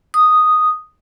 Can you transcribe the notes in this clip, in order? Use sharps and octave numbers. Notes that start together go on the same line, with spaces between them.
D#6